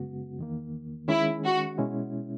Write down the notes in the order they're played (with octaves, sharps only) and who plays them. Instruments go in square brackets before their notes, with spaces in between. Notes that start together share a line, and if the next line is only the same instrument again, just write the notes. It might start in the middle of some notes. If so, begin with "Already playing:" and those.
Already playing: [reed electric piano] F#2 C#3 G#3 B3 F#4
E2 D#3 A#3
[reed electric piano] D#3 G#3 C#4 G#4 [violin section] E4
[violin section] F#4
[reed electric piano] B2 G#3 C#4 E4